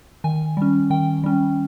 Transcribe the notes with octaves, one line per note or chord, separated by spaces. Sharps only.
D#3 G#5
G3 C#4
D#3 G5
G3 C#4